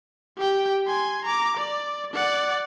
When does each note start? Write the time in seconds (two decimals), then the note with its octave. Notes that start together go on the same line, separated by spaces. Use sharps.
0.38 G4 G5
0.87 G#5 C6
1.25 A#5 D6
1.57 D5
2.13 D5 F#5